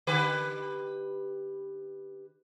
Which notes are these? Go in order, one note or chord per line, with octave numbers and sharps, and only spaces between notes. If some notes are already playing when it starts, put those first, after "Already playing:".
D3 G4 B4